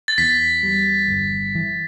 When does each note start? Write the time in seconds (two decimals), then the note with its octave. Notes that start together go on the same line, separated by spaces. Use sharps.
0.08 A6
0.18 E2 B6
0.63 G3
1.08 G1
1.55 E3